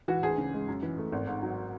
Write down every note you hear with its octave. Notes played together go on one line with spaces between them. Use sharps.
E3 F#4
D2 G#4
C#3
G#3
F#2
E3
A3
G#1
G#2
F#3